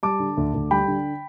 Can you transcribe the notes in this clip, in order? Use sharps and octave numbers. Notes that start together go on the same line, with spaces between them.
G3 A5 D6
D3
D2
D2
G3 G5 B5
D3